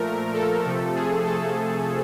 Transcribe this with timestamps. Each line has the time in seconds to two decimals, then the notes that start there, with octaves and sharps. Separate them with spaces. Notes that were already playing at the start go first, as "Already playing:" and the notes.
Already playing: A#2 F3 A3 A#4
0.34 A4
0.65 C3 F3 A3
0.96 G#4
1.27 A4